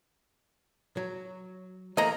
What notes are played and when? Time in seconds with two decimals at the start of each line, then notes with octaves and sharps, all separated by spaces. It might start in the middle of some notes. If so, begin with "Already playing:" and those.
0.97 F#3
1.97 E3 A3 A#3 D#5 A#5